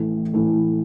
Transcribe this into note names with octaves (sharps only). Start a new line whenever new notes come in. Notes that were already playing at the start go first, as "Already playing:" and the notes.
Already playing: A1 A2 E3 A3
A1 A2 E3 A3